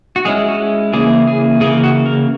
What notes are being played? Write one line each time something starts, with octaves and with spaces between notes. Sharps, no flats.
F#4
G#3 C#4 E4 G#4
F#4
C#3 E3 A#3 E4 G#4
G#4
C#3 E3 A#3 G#4
F#4
A#4